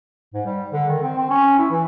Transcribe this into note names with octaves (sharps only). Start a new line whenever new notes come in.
G#2
G3
D3
D#3
C4
C4
C#4
E4
E3